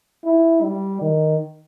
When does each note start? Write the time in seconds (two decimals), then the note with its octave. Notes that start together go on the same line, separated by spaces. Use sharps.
0.24 E4
0.62 G3
1.02 D#3